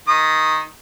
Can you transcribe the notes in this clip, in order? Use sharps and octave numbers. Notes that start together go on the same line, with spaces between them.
D#3 D#6